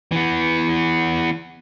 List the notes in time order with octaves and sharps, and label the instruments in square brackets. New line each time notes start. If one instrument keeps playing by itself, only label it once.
[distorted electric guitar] E3 B3